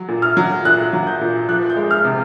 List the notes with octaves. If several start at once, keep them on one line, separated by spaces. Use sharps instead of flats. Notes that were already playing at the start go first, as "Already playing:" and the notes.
Already playing: F#3
A#2
F6
F#3
A#2 F#6
F#3
G6
A#2
F3 F#6
G6
G#3
F6
C3